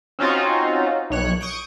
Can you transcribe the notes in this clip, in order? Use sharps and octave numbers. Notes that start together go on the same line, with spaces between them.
C4 C#4 D#4 F4 F#4
B1 C#5 F#6
C#6 D#6 G6 D7